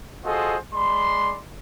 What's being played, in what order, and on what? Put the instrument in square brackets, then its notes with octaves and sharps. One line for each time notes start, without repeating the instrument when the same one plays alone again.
[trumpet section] F4 F#4 G#4 A4 C5 D#5
G#3 D5 B5 C6